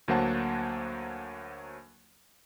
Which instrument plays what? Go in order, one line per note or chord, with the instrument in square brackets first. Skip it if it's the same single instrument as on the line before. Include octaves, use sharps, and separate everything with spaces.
[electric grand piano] D2 F#3 A#3 C5 F#5 A5